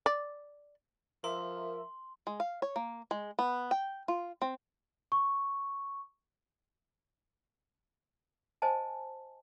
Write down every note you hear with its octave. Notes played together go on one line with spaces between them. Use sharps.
D5
F3 A#4 E5 C6
G#3
F5
C#5
A#3
G#3
B3
G5
F4
C4
C#6
C5 D#5 G#5 A5